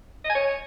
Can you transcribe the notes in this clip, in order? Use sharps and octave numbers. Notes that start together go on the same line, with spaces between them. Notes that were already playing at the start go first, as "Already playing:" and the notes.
D#5
G#5
C#5